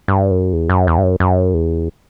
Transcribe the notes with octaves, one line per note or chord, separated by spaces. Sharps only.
G2
F#2
E2
F#2
E2
G2
F#2
F#2
E2